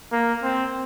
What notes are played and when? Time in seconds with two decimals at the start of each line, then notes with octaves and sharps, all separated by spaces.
0.12 A#3
0.43 C4